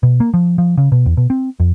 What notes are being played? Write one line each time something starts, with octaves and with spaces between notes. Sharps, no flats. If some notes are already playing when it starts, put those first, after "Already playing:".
B2
A#3
F3
F3
C#3
B2
E2
B2
C4
F2